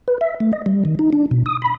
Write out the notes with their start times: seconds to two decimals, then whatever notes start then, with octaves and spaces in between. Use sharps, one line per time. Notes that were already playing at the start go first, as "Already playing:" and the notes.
0.08 B4
0.21 E5
0.40 A3
0.53 D#5
0.66 G3
0.85 D#3
0.99 D#4
1.13 D4
1.31 B2
1.46 D#6
1.62 B5